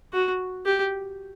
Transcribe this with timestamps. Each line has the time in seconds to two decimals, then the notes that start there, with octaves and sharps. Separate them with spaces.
0.13 F#4
0.66 G4